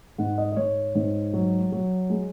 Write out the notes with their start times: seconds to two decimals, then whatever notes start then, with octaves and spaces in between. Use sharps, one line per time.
0.18 G#2 F#5
0.38 D#5
0.52 D#5
0.57 G#2 C#5
0.95 G#2
1.34 F#3
1.72 F#3
2.10 G#3